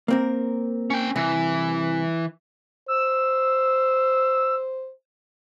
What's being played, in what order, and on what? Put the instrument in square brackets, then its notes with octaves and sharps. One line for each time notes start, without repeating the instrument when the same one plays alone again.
[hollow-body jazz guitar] A#3 C4 A#4
[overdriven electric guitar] C#4 G5
[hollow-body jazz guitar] C2 [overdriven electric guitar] E3
[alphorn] C5 [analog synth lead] E6